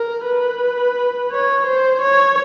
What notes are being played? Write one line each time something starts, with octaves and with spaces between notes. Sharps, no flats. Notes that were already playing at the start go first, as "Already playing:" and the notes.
Already playing: A#4
B4
C#5
C5
C#5